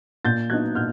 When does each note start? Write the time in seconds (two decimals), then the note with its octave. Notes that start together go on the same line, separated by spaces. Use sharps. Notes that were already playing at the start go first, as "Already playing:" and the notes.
0.25 A#2 G6 A6
0.50 F#3 B3 D#4 F#6 G#6
0.75 A#2 F6 G6